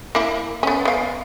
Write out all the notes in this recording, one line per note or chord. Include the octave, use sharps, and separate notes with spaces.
A#3 E4
B3 C#4
B3 F5